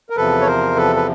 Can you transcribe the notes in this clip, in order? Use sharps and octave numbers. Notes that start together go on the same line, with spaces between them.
A#4
E2 C3 F3 A4 B4
C#5
A#4 C5
A4 B4
B4